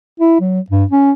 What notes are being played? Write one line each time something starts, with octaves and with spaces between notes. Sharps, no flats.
E4
F#3
G2
C#4